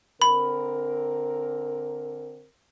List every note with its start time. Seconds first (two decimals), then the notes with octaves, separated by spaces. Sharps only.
0.22 D3 C4 A#4 B5